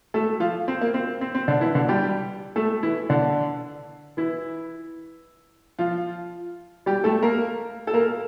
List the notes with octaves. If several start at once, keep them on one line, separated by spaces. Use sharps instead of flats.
A3 A4
F3 F4
C4
A#3
C4
C4
C4
D3 D4
E3 E4
D3 D4
G3 G4
A3 A4
E3 E4
D3 D4
E3 E4
F3 F4
G3 G4
A3 A4
A#3 A#4
A4
A#3 A#4